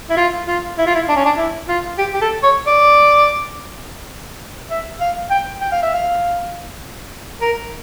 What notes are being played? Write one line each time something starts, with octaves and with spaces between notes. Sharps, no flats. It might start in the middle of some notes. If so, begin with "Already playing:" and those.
E4
F4
F4
E4
F4
E4
D4
C#4
D4
E4
F4
G4
G4
A4
C#5
D5
E5
F5
G5
G5
F5
E5
F5
A#4